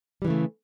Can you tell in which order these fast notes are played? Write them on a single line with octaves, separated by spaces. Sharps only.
G3 E3 C#3 A3